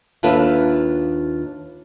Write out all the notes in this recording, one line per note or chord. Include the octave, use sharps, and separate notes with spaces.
D#2 D4 F4 A4 B4 E5